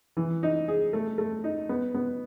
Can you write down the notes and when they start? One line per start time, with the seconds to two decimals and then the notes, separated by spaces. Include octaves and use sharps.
0.17 E3
0.43 D#4
0.68 G#4
0.93 A3
1.18 A3
1.44 D#4
1.69 B3
1.94 B3